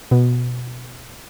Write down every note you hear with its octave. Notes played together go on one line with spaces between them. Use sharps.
B2